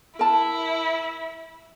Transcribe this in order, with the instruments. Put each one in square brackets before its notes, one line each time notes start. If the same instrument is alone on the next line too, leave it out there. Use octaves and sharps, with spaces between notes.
[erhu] E4 [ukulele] A#4 A5